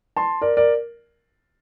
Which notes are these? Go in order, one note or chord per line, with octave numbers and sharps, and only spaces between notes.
A5 C6
A#4 D5
A#4 D5